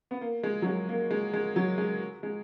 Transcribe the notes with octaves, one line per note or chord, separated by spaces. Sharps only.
B3
A#3
G#3
F#3
G#3
A#3
G#3
G#3
F#3
G#3
G#3